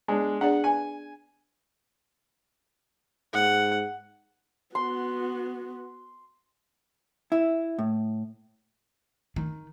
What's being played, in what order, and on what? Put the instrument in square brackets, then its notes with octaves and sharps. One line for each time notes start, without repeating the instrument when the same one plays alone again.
[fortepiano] G#3 D4 [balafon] B3
[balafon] D4 G#4 D5 [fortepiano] F#5
[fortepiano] G#5
[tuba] G#2 [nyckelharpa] F#5
[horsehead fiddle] B3 F#4 [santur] C6
[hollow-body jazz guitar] E4
A2
[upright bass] D#3